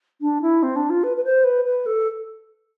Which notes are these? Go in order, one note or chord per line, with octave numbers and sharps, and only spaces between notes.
D4
E4
C4
D4
F4
B4
B4
C5
B4
B4
A4